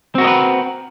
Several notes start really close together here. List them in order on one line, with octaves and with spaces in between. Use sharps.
C4 F#4 A#4 D#5 B4